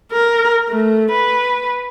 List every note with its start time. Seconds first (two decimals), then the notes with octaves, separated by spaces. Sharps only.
0.12 A#4
0.69 A3
1.11 B4